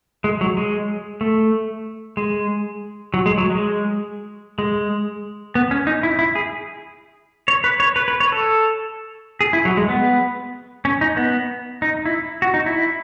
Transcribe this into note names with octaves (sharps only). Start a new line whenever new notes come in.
G#3
F#3
G#3
A3
G#3
F#3
G#3
F#3
G#3
G#3
B3
C#4
D#4
E4
E4
G#4
C#5
B4
C#5
B4
B4
C#5
A4
G#4
E4
F#3
G#3
B3
C#4
D#4
B3
D#4
E4
F#4
D#4
E4